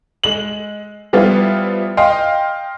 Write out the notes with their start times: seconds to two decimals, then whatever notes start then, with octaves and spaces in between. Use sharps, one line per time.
0.24 G#3 F#7
1.13 F3 G3 B3 E4 F4
1.97 D#5 F5 G5 C6